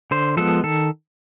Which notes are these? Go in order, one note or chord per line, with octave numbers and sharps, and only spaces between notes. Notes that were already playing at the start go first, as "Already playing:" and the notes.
D3 C5
F3 G#3 B3 A4
D#3 A4